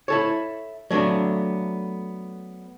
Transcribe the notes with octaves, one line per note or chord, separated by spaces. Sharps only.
E4 A4 C#5
F#3 A3 B3 D4